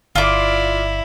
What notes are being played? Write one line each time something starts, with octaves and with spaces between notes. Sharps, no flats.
G1 E4 F4 D5 F5 D6